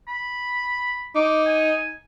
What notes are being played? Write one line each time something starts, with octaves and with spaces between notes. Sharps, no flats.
B5
D#4 D6
G#5